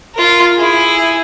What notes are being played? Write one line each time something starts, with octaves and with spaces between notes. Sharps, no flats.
F4 A#4
E4 G#4